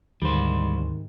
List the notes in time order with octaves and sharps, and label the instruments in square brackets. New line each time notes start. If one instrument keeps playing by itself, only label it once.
[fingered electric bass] D2 [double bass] G#2 C3 [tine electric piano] D#3 [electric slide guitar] G3 C5